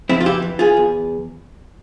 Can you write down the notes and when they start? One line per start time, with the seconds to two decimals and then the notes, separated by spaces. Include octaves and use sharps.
0.09 F2 C4 E4
0.21 F4
0.25 E3 E4 G4
0.42 E3
0.59 E2 F4 G#4
0.77 E2